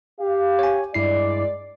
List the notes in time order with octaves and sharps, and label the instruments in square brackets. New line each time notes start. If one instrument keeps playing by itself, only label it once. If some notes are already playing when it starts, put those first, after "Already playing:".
[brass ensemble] G4 F5
[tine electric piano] C#5 G#5
[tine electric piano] G2 E4 C7 [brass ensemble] G#3 D5